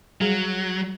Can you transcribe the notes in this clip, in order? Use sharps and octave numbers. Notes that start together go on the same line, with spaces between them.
F#3 G3 G#4